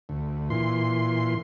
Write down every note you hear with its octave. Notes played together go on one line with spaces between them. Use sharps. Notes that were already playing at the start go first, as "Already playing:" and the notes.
D2
A#2 E3 C6